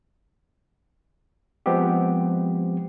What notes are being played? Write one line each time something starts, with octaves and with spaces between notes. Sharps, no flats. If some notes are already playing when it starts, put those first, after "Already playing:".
F3 G#3 B3 C4 G4